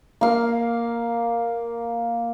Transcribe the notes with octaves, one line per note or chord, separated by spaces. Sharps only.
A#3 F5